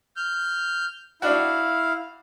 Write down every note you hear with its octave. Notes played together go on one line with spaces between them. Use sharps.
F6 G6
D4 E4 F#4 F5